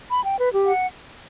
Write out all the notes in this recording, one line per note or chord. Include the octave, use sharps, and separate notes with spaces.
B5
G5
B4
G4
F#5